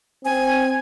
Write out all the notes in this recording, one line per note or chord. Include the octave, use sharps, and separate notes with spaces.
C4 G#5